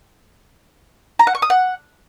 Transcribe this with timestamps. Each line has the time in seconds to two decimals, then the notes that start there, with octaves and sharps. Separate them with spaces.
1.19 A#5
1.27 F#5
1.35 C#6
1.42 D#6
1.50 F#5